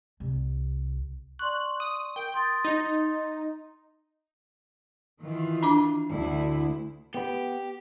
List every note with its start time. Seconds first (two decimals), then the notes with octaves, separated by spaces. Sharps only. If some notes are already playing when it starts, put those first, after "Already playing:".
0.20 C2
1.39 D5 C6 C#6 F#6
1.80 D#6
2.16 A#4 G5
2.34 C6 D#6 A6
2.65 D#4
5.20 D#3 E3 F4
5.63 D4 A#5 D6
6.10 D2 E4
7.14 B3 G4 B4